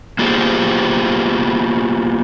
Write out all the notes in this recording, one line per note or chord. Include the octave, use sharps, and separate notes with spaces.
A#3 B3 F4 G4 G#4 C5